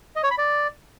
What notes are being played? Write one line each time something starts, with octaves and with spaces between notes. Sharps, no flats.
D#5
C#5
B5
D5